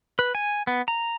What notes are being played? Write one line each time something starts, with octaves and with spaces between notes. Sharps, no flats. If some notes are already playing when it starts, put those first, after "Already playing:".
B4
G#5
B3
A#5